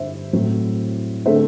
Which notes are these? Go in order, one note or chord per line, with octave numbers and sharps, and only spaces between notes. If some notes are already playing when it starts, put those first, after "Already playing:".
Already playing: G2 D3 G3 C5 E5
A2 F#3 C4
D3 A3 C4 C5 E5